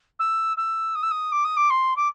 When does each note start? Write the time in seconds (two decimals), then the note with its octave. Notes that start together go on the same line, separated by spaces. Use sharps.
0.19 E6
0.57 E6
0.95 D#6
1.03 E6
1.11 D#6
1.32 D6
1.44 D#6
1.57 D6
1.70 C6
1.96 D6